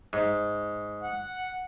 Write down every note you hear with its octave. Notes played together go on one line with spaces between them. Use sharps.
G#2
F#5